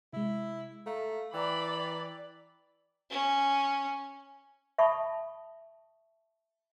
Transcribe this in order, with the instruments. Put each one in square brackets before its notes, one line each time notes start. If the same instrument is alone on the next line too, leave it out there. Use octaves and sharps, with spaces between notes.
[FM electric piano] C3 G#3 [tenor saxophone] E4
[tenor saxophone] A3 [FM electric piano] F5 A#5
[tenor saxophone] E3 [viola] D5 B5 [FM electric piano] G5 A#5
[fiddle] C#4
[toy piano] E5 A5 B5 C#6 D#6